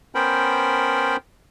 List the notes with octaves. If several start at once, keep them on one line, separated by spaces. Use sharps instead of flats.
B3 C#4 A#4 C5 G5 B5